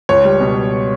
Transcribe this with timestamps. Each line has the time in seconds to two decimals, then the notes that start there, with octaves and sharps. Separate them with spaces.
0.09 C#2 C#5
0.25 G3
0.40 B2